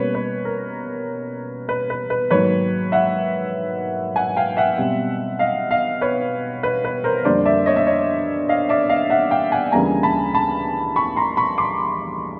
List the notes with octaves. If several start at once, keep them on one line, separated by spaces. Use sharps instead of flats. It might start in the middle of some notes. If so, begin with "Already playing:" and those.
Already playing: B2 G3 A#3 C#4 B4 C#5
B4
A#4
B4
B4
B4
G#2 D#3 F#3 A#3 B4 C#5
E5 F#5
F#5 G#5
F5 G5
E5 F#5
B2 G3 C4
D#5 F5
D#5 F5
B4 C#5
B4
B4
A#4 C5
F2 D3 G3 A#3 D4 C5 D5
D5 E5
C#5 D#5
E5
C#5 D#5
D#5 F5
D5 E5
D#5 F5
E5 F#5
F5 G5
F#5 G#5
D2 C#3 E3 G3 A#3 G#5 A#5
A5 B5
A5 B5
B5 C#6
A#5 C6
B5 C#6
C6 D6